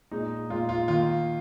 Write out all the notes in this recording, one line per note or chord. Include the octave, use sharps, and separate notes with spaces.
A#2 G#3 D#4
A#2 G#3 F4
F4
D#3 A#3 F4